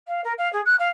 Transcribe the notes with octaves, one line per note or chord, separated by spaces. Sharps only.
F5
A#4
F5
G#4
F#6
F5